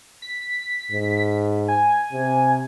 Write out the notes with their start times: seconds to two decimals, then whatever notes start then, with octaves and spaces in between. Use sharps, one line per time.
0.22 B6
0.91 G#2
1.68 G#5
2.12 C3